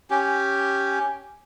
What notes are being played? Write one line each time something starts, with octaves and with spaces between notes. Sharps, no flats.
C#4 G4